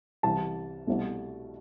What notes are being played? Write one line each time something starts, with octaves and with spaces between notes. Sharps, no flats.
C2 C3 E3 A5
C2 B2 A3